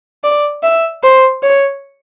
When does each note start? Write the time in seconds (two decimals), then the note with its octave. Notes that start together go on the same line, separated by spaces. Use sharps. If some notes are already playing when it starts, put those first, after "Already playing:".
0.24 D5
0.63 E5
1.03 C5
1.43 C#5